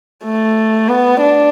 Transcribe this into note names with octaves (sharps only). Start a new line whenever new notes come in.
A3
B3
D4